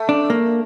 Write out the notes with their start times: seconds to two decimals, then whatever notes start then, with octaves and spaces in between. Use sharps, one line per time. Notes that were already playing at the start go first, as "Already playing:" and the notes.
Already playing: A3
0.09 D4
0.30 A#3